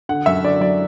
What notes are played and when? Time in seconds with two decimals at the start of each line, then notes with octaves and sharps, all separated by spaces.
0.09 D3 F#5
0.26 F#2 E5
0.44 D3 D5
0.61 F#3 D5